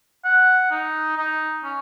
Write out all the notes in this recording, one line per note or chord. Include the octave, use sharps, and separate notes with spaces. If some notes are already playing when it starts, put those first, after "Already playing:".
F#5
D#4
D#4
C#4